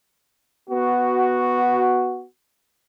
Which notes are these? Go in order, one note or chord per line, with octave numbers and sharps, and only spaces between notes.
B3 F#4